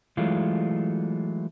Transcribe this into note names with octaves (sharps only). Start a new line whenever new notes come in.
E3 F#3 G#3 A3 F4